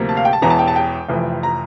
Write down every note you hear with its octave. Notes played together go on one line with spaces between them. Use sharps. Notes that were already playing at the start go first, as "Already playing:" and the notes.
Already playing: D2 C3 F3 A#3
A5
F5
G5
A5
E1 E2 E3 A#5
A5
G5
A5
G5
F1 F2 E3
A#5